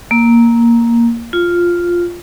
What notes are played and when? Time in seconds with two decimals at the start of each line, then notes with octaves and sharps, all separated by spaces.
0.11 A#3
1.33 F4